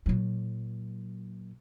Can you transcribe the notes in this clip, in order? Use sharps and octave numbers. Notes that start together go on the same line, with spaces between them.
A#2 F#3